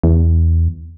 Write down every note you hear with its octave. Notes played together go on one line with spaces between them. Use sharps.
E2